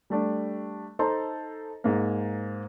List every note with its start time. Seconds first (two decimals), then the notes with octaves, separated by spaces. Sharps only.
0.10 G3 A3 D4
0.99 D#4 A4 C5 A#5 C6
1.84 G#2 A#3